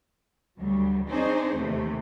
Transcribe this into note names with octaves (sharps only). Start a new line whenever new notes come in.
D2 F#3 G3
C4 D4 D#4 G#4 C5 C#5
D#2 C3 E3 A3